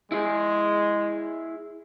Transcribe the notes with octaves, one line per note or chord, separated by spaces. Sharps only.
G#3 E4 G#4